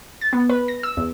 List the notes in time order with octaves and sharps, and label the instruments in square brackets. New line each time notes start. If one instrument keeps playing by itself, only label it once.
[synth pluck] A6
B3
B4
A#6
E6
E2